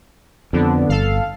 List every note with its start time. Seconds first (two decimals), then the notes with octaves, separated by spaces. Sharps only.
0.53 F2 D3 B3 D4
0.89 G1 A4 F5